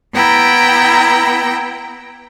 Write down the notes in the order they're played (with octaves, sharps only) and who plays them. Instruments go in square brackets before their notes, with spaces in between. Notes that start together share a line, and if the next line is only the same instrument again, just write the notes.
[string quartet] B3 E4 G5 A#5